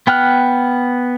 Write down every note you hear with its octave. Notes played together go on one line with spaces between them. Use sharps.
B3 G5 F6 F#6